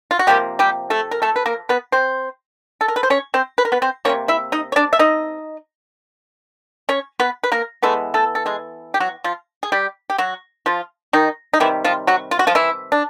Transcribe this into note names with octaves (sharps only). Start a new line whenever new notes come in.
F4
F#4
C3 F3 G3 A#3 G4
G3 G4
A3 A4
A#4
A3 A4
B4
A#3 A#4
B3 B4
C4 C5
A4
A#4
B4
C5
C#4 C#5
C4 C5
B4
A#4
B3 B4
C4 C5
C3 F3 A#3 C#4 C#5
E4 E5
D#4 D#5
C#5
D4 D5
E5
D#4 D#5
C#4 C#5
B3 B4
B4
A#3 A#4
E3 G#3 A3 B3 A4
A3 A4
A4
G#3 G#4
G4
F#3 F#4
F3 F4
G#4
G3 G4
G4
F#3 F#4
F3 F4
D#3 D#4
D#4
C3 D#3 E3 G3 E4
F3 F4
F#3 F#4
F4
F#4
F3 F4
E3 E4
D4